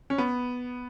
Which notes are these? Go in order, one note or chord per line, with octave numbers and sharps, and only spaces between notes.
C#4
B3